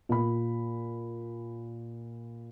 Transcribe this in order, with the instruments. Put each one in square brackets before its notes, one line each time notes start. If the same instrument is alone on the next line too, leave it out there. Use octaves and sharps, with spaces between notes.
[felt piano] A#2 B5